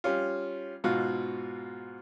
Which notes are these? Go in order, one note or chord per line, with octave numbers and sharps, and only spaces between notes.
G3 C#4 F4
G#2 B2 F4 F#4